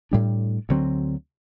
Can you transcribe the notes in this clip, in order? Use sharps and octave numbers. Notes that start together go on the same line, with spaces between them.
A2 G3 D4
D2 D3 F#3 C4